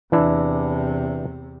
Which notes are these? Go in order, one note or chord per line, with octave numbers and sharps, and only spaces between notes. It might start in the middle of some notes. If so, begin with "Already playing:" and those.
E2 C3 E3 D4 E4